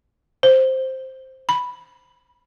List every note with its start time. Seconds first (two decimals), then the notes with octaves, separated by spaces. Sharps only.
0.43 C5
1.49 B5